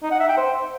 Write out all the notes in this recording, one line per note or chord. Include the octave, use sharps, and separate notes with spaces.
D#4
F#5
E5
G5
C5